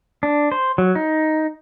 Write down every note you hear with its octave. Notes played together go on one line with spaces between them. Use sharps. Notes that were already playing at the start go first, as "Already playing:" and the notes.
D4
C5
F#3
D#4